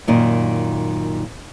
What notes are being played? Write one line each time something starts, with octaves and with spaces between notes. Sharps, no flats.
F#2 A#2 D#3